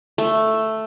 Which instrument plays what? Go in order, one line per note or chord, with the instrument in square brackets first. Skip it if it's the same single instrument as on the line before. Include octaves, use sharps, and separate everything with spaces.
[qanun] A3